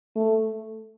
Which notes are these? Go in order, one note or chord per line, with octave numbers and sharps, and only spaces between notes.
A3